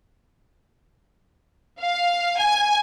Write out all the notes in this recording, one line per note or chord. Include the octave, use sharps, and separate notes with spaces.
F5
G#5